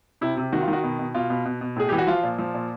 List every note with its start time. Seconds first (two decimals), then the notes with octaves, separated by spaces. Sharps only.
0.21 C3 E4
0.37 C3
0.52 D#3 F#4
0.62 F4
0.68 D#3
0.73 F#4
0.83 B2
0.99 B2
1.14 B2 F4
1.30 B2
1.45 B2
1.61 B2
1.76 A2 G#4
1.89 E3 G4
1.98 F#4
2.07 F3 F4
2.23 A#2
2.38 F3
2.54 A#2